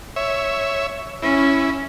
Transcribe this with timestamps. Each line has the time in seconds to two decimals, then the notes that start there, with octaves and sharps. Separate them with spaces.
0.16 C#5 E5
1.22 C#4 E4